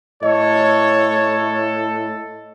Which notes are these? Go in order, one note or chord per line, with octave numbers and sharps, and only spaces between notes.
A2 A4 C#5 D#5